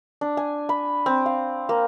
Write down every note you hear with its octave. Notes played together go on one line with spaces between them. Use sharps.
D4
G#5
B5
C4
F5
A#3